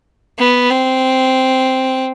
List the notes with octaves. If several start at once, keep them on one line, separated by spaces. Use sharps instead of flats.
B3
C4